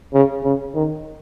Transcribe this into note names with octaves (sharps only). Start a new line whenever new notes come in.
C#3
C#3
D#3